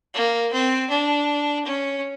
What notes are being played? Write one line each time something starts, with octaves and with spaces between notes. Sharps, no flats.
A#3
C4
D4
C#4